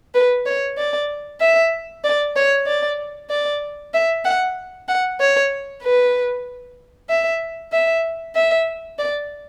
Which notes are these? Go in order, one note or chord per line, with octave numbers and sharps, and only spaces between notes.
B4
C#5
D5
E5
D5
C#5
D5
D5
E5
F#5
F#5
C#5
B4
E5
E5
E5
D5